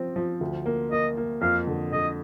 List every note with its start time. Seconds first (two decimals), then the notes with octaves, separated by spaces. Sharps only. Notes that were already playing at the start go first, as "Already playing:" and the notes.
Already playing: F3 C4
0.16 F3
0.41 D2
0.66 A#3
0.92 A#3 D#5
1.17 A#3
1.41 F2 F5
1.67 D3
1.93 D3 D#5